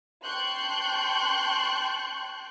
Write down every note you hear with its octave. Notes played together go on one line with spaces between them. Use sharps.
G5 A5 C6 C#6 F#6 G6